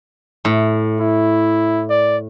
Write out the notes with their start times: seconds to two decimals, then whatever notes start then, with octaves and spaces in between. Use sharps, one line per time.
0.45 A2
0.99 E4
1.90 D5